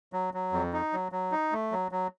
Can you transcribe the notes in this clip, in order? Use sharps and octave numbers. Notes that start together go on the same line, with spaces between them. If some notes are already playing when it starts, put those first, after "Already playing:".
F#3
F#3
F2
D#4
F#3
F#3
D#4
A3
F#3
F#3